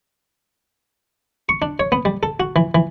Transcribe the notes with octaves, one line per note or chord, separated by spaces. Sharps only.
C#6
D4
C#5
B3
G3
A4
F#4
E3
E3